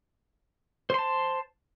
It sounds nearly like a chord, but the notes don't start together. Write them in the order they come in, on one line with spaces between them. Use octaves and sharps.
C5 C6 A5